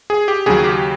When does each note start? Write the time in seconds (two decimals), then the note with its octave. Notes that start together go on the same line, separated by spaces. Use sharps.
0.10 G#4
0.28 G4
0.46 D#2 C#3 F#3 G#4
0.64 G4